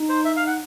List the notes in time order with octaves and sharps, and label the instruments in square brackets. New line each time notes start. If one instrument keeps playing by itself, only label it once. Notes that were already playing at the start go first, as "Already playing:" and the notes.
Already playing: [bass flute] D#4
[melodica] C5
E5
F5
F#5